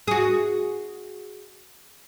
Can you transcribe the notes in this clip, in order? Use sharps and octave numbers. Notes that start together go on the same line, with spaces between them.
F#4 G#4